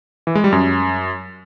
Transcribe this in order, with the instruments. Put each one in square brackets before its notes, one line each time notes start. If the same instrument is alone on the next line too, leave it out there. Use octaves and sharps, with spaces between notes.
[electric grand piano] E3
G#3
G3
F#2